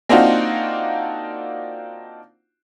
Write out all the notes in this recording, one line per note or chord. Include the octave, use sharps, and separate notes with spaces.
A#3 C4 D4 D#4 F4 F#4